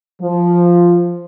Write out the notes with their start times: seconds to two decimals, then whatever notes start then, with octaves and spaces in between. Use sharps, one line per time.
0.22 F3